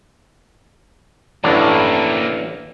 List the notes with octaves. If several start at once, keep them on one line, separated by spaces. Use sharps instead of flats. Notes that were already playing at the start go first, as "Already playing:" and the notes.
A1 A2 A#3 D4 E4